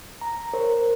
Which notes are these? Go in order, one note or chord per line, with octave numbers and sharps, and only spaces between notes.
A#5
A#4 C5 C#5